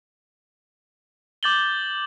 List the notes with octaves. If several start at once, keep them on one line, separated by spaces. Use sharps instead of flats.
D6 G6 A6 F#7 G7